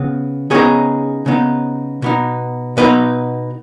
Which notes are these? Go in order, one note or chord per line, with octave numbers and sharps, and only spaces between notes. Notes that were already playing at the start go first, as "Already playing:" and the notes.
Already playing: C#3 B3
C#3 B3 D#4 G#4 C#5
C#3 B3 D#4
B2 B3 D#4
B2 B3 D#4 B4 D#5